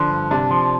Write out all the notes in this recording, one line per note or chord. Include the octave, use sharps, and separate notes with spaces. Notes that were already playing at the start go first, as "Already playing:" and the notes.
Already playing: D3 F3
G2
C3 D4
F3